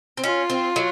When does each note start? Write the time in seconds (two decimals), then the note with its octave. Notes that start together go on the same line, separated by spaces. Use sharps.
0.17 C4
0.24 C#4 F4
0.50 C4
0.76 F#3